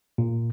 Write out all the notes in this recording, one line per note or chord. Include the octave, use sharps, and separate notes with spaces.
A#2